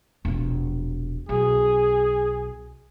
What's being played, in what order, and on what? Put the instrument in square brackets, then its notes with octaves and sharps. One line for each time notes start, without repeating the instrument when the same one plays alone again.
[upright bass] E1 A#1
[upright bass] B1 [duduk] G#4